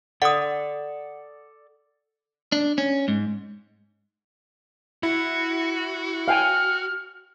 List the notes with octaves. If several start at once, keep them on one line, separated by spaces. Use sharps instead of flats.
A4 D5 F#5 D#6
D4
C#4
G#2
E4 F#4
F5 G5 G#5 F6